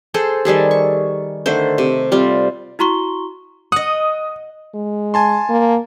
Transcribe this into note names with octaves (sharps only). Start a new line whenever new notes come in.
G#4 A4 C5
D#3 G3 G#4 A4
C#6
D3 D#3 A3 C5
C3
G3 C4 F4
E4 F#4 A#5 C6 C#6 G7
D#5 F#5 D#6
G#3
G#5 A5 C6
A#3